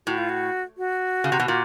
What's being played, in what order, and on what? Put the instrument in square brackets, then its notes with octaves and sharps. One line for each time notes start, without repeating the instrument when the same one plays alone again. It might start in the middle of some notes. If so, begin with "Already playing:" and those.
[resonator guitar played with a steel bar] A2 [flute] F#4
[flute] F4
F#4
F#4
[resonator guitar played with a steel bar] C#3
C3
B2
A#2